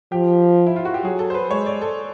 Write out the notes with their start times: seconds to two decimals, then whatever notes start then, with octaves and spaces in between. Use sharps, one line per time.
0.12 F3 G4
0.67 E4
0.76 F4
0.85 F#4
0.94 G4
1.04 F#3 G#4
1.19 A4
1.30 C5
1.34 B4
1.50 G#3 C#5
1.66 D5
1.81 A4